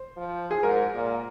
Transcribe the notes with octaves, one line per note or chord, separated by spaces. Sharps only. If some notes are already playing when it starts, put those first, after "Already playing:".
Already playing: C5
F3
G#4
G#2 A#4
A#2